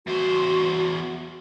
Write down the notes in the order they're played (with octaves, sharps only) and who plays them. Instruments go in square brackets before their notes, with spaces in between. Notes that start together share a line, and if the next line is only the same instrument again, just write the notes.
[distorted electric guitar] E2 C5 [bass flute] F#4